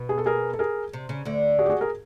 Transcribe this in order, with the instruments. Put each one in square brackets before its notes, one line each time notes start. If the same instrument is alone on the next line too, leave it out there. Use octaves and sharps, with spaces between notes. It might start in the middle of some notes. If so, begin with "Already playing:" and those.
Already playing: [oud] B2
[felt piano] G#4
A4
G#4 A#4
A4
G#4 A#4
[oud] C3
C#3
D2 D3
[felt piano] F#4 G#4
G4
F#4 G#4
G#4 A#4